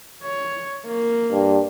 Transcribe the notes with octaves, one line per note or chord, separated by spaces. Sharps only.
C#5
A#3
G2